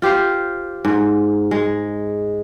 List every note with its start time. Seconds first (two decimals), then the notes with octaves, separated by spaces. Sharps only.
0.02 F4 G4 C5 F5
0.85 G#2
1.51 G#3